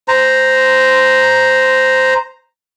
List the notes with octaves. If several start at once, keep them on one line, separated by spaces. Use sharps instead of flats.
C5 A#5